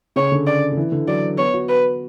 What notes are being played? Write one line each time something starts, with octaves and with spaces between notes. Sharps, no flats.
C#3 C#5
D3
D5
D3
E3
D3
F#3 D5
B3 C#5
F#4
B4